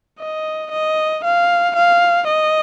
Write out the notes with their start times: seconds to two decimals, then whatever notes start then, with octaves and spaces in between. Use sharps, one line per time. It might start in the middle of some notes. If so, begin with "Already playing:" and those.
0.20 D#5
0.72 D#5
1.24 F5
1.76 F5
2.27 D#5